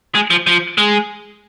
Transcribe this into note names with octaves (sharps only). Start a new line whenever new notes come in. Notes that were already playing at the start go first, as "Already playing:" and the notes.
G#3
F3
F3
G#3